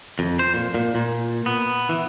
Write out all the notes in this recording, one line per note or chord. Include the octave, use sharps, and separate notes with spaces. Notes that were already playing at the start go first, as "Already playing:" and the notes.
F2
C5
A#2
A#2
A#2
B3
E3